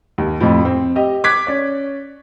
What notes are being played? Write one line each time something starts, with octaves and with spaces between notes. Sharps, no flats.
D#2
F2 A2 F3
C4
G4 D#5
D6 F#6 G#6 B6
C#4 D5